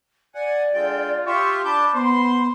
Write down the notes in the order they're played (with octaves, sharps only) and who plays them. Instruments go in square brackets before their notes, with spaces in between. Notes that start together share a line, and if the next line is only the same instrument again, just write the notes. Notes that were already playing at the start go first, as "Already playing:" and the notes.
[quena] D5 [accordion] F#5 G#5
[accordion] D3 G#3 G5 [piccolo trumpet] F4
[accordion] F4 G4 E5 [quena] C6 [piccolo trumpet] C#6
[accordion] D4 A5 G6 [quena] B5 [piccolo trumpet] D6
[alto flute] B3 [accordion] C5 [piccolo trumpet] C6